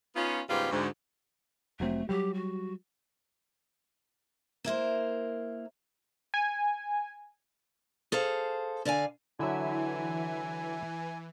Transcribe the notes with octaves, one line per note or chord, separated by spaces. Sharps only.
B3 C#4 D#4 F4
G#2 C#3 G3 B3 F4 G4
D2 G#2
F1 F#3 A3 C4
F#3 G3 G4
F#4
A#3 E4 A#4 C5
G#5
G#4 A4 C5 F5
D3 D5 F5 G#5
D3 E3 F#3 E4 E5 G#5